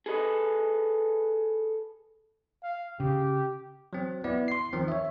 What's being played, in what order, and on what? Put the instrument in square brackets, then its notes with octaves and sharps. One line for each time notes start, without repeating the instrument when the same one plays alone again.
[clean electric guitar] G#4 A4 B4 D#5
[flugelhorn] F5
[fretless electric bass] C#3 [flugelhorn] G4
[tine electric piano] F#3 C4
B3 E4 D5
C6 C7
D#3 F3 C4
C#5 E5